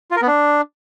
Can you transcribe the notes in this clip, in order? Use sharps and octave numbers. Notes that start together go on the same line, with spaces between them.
F4
A#4
B3
D4